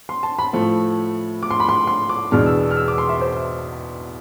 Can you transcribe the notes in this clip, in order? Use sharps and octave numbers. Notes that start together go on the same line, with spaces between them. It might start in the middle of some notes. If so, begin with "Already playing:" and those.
C6
A5
B5
A2 F3 A3
D6
C6
B5
C6
C6
D6
E2 B2 G#3 D4 F6
E6
F6
E6
D6
C6
E5
C5